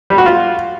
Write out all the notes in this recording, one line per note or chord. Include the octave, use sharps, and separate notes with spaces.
G3
F#4
F4